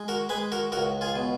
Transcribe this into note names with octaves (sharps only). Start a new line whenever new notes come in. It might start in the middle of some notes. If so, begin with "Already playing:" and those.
Already playing: G#3
F#4 A#4
G#3 G#4 B4
F#4 A#4
C#2 F#4 A#4
F4 G#4
B2